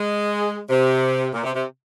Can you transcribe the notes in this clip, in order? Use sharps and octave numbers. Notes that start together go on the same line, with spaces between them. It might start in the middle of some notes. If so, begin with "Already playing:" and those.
Already playing: G#3
C3
A#2
C3
C3